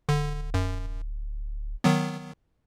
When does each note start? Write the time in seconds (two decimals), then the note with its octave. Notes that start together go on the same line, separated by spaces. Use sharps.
0.09 D1 D3
0.54 F#2
1.84 D#3 F#3 B3